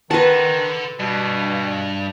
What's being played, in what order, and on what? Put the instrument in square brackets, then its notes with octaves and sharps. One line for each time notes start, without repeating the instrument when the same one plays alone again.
[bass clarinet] D#3 [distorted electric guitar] A4 F#5 [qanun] B4 A5
[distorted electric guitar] G2 [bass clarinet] B2